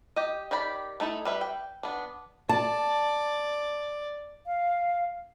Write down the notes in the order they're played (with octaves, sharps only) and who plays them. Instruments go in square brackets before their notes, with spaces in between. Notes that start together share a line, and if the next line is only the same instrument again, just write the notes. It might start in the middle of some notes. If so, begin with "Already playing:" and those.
[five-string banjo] G4 D#5
D#3 G4 D5 B5
A3 D#4 E4 A4
G3 B4 E5
G5
B3 D4
[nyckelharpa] D5 [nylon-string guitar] A5
[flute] F5